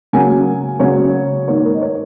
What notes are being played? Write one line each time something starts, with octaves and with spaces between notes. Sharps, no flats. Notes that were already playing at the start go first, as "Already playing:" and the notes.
C#3 F#3 A#3 G#5
C#3 F#3 A#3 C#5
G#2 D#3 A#3 C#5
A#4
D#5
C#5